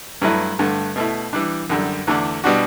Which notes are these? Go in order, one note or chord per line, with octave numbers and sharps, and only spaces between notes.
G2 F#3 A3 E4 B4
G2 D3 A3
B2 A3 E4
E3 G3 D4
F#2 D3 G3
E2 D3 A3 D4
B2 G3 D4 F#4